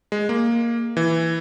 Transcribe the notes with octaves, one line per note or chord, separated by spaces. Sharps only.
G#3
A#3
E3